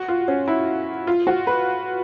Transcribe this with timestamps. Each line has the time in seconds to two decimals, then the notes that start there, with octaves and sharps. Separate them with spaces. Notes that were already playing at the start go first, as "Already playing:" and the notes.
Already playing: F#4
0.08 F4
0.28 C#4
0.48 E4
1.07 F4
1.27 F#4
1.47 B4